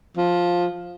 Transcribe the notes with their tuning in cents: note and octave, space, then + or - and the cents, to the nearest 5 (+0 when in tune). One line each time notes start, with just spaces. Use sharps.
F3 +10